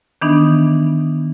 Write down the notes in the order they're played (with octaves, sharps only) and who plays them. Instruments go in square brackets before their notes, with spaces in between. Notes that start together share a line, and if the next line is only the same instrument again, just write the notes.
[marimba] D#3 E3 B3 D4 D#4